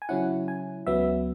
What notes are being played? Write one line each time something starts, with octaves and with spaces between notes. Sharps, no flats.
G#5
C#3 F#3 C#4 E4 F#5
G#5
C#2 C#3 F#3 B3 E5